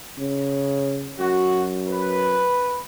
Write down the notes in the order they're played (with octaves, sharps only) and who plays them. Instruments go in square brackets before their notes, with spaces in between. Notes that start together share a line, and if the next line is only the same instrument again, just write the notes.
[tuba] C#3
[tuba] F#2 [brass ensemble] F#4
[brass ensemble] B4